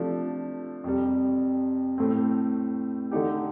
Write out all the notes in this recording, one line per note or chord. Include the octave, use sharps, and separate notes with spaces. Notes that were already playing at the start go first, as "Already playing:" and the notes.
Already playing: C3 F3 A3 D4 A4
F2 C3 G3
A2 A3 C4
D3 A3 D#4 G4